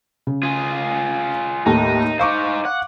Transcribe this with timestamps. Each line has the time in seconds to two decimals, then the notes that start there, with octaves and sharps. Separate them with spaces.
0.27 C#3
0.43 F4 G#4
1.66 D#2 A2 A3 D#4
2.19 D#4 C5 F5 C#6 D6
2.65 F#5